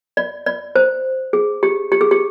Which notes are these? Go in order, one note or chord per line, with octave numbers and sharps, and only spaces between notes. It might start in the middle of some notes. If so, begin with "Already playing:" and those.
D5
D5
C5
G#4
G4
G4
G#4
G4